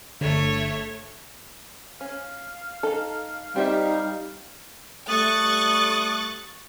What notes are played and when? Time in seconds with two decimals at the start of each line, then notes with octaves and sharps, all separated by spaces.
0.21 G1 D3 A3 C#5
2.01 C#4 F5
2.83 D#4 A4
3.56 G3 C4 D#4 G4 E5 F5
5.09 G3 A3 C#6 D#6 F#6 A6